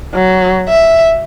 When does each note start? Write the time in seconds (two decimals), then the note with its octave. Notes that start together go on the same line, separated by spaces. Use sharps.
0.14 F#3
0.69 E5